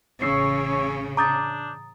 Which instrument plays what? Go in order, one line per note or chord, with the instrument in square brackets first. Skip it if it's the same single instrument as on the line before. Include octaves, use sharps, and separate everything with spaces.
[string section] A1 C#3 [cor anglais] C#5 [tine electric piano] C#6 E6 C7
[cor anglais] D4 [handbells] A#5 D#6 A6 [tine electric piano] D6 G6